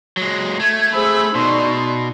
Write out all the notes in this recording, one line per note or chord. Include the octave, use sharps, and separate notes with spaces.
F#3 G#3
A3 G#6
G#4 C5 B5 E6
B2 D#4 D5 C6 C#6